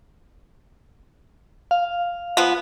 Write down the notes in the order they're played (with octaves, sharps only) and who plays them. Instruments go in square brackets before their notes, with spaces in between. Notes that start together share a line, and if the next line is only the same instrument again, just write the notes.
[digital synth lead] F5
[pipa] F3 B3